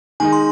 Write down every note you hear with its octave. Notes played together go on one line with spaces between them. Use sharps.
D#3 G#3 D#4 G#5
C6